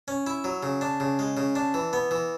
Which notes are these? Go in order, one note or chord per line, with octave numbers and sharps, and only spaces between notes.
C#4
E4
F#3
C#3
D4
C#3
G#3
C#3
D4
E3
B3
E3